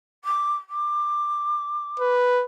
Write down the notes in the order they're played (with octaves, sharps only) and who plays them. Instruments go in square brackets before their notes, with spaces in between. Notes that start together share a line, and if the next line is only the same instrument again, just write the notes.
[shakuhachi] D6
D6
[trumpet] B4